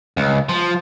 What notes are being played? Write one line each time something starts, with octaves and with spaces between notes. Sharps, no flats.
C#2
F3